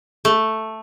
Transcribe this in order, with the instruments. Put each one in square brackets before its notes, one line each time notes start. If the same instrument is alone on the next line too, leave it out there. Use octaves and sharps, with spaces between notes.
[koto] A3